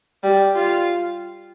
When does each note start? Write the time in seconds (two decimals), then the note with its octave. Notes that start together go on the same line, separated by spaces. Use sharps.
0.23 G3
0.55 F4